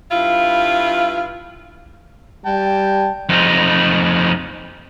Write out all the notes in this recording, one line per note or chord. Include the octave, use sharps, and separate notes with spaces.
G2 E4 F4
G3 G5 A5
F2 D#4